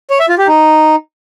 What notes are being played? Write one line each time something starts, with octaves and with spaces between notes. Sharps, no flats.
C#5
E5
F4
G4
D#4